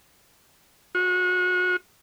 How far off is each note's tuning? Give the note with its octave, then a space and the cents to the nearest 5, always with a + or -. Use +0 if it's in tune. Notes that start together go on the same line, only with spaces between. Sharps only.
F#4 -30